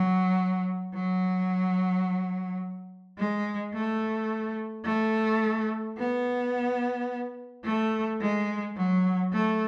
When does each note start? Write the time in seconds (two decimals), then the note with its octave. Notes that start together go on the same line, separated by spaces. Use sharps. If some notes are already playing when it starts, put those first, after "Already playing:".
Already playing: F#3
0.94 F#3
3.18 G#3
3.74 A3
4.85 A3
5.98 B3
7.65 A3
8.21 G#3
8.77 F#3
9.33 A3